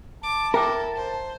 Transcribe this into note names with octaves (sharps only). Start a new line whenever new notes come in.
A5 D6
E4 A4 A#4 E5 G5 D6
C5